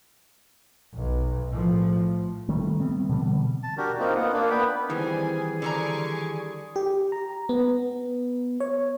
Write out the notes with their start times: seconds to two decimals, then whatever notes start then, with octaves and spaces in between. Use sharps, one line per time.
0.94 B1
1.50 A2 F3
2.49 D#3 G3 A3
2.80 G3 B3 C4
3.09 B2 D3 E3 G3
3.63 A5
3.77 D4 F#4 G4 A#4
3.99 A#3 C4 D#4 F4
4.15 B3 F4 F#5
4.33 A#3 D4
4.50 B3 B4 G5 B5
4.90 D#3 E3 G3 C4 G#4 G#5
5.62 D3 G3 G#5 A#5 C#6 D6
6.76 G4
7.12 A#5
7.49 B3
8.60 C#5